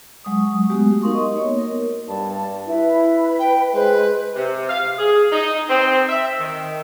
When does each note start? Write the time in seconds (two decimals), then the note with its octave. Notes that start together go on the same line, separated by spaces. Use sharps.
0.25 F#3 G#3 C#6 D#6
0.70 G#3 A3 B3 F#4 G4
1.02 D#4 A#4 F5 C6 C#6 D#6
1.14 D#5
1.36 A#3 B3 C#5
1.59 A#4
2.08 G2 A5
2.68 E4 B4
3.39 G5
3.74 G#3 B4 C5
4.35 C3
4.68 F5
4.99 G#4
5.32 D#4
5.69 C4
6.08 E5
6.39 D#3